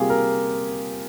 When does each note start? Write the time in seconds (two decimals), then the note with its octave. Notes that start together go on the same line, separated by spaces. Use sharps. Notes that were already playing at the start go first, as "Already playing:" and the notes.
Already playing: C3 G3 A#3 F4 G4 G#4
0.10 A#4